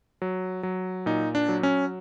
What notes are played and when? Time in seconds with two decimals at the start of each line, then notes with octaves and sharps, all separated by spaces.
0.22 F#3
0.63 F#3
1.06 A#2 D#4
1.35 D4
1.49 F#3
1.63 C#4